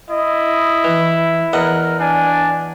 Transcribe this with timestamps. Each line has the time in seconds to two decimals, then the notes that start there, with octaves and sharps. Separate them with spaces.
0.10 E4 D#5
0.84 E3
1.53 E2 A#4 D#5 F#5
2.00 D4 G#5